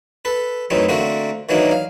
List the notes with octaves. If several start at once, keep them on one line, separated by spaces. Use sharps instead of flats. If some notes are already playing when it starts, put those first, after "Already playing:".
A4 B4
F#2 A2 E3 A3 C4 D#4
D3 A3 A#3 C4 F#4 A#4
D#3 E3 F#3 A#3 D4 D#4
F5